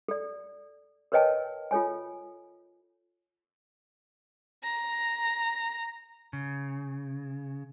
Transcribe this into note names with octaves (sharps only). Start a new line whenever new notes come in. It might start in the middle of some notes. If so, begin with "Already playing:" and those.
A4 D5
A#4 B4 C#5 D#5 G5 A5
F4 A4 C#5 G#5
A#5
C#3